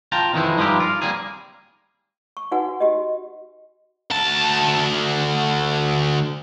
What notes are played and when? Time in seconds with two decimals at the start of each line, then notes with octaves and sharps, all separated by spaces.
0.12 F4 G5 A5 A#5
0.33 F2 D#3 E3 G#3 D#4 E4
0.58 G2 F3 G#3 D#4 E4 G4
0.80 F4 A#4
1.02 G3 A#3 C4 G#4
2.37 C#6
2.52 D#4 F#4 B4 F#5 G#5
2.80 F#4 G4 D#5
4.10 D2 A5